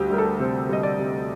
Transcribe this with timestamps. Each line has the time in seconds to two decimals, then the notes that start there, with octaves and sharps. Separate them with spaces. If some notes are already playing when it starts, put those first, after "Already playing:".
Already playing: D2 G3 G4
0.10 G3 A#4
0.18 A4
0.39 C3 C5
0.69 G3 D#5
0.83 D5
0.99 C3